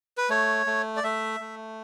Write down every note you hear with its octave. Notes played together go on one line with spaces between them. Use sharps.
B4
A3 C#5
A3
D5
A3 E5
A3